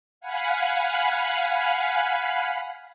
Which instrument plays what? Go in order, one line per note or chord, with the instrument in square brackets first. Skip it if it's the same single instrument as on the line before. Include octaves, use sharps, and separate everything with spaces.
[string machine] F5 F#5 G#5 B5